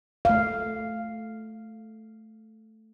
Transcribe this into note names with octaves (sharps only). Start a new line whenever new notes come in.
A3 F5